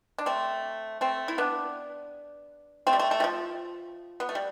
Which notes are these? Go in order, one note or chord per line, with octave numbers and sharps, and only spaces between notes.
D4
A3 C4
A3 C4
E4
B3 D4
A3 C4
G3
A3
A3
G3
F3
B3
A3
G3